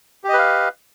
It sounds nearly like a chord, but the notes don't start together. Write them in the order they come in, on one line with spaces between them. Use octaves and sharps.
G4 D#5 B4 F5